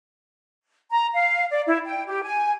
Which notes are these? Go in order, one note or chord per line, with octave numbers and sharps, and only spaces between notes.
A#5
F5
D5
E4
G5
G4
G#5